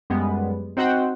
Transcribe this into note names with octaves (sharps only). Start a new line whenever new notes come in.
F#2 G3 G#3 B3
C4 D#4 F#4 C5 F#5 G5